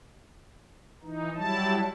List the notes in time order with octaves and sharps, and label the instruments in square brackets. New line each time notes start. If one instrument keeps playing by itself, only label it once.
[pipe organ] E3 D#4
F#3 G3 E4 A5